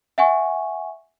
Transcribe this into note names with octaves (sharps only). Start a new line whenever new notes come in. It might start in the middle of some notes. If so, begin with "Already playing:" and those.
E5 F#5 G#5 C#6